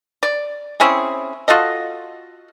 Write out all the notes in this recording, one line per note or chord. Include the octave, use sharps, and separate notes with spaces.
D5
C4 C#4 E4 G#4
F4 F#4 A4 D#5